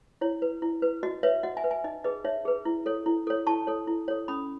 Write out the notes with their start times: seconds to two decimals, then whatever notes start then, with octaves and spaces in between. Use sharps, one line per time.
0.21 E4 C#5
0.42 B4
0.62 E4
0.82 B4
1.03 F#4 D#5
1.23 B4 C#5 E5
1.43 F#4 D#5 F#5
1.57 E5 G#5
1.64 B4
1.71 E5 G#5
1.84 D#4 D#5
2.04 G#4 B4 D#5
2.24 D#4 C#5 E5
2.45 G#4 B4
2.65 E4
2.86 A4 C#5
3.06 E4
3.27 A4 C#5
3.47 E4 A5 C#6
3.67 A4 C#5
3.87 E4
4.08 A4 C#5
4.28 C#4 B5 D#6